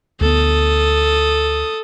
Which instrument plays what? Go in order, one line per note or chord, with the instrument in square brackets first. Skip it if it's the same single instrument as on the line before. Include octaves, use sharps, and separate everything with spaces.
[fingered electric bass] D2 B3 [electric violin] A4 D#6